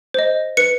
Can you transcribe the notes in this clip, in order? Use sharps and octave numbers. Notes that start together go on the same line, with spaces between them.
C5 D#5
B4 C#7